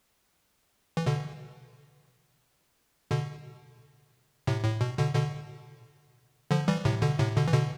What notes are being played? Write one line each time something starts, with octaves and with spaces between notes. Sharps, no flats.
E3
B2 D3
B2 D3
A2 C3
A2
B2
B2 D3
B2 D3
D3 F3
E3 G3
A2 C3
B2 D3
A2 C3
B2 D3
E3
B2 D3